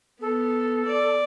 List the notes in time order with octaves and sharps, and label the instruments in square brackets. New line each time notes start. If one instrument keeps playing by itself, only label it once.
[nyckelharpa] B3 [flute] A4
[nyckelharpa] D5